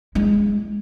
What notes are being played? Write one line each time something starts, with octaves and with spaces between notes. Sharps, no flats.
G#3 E4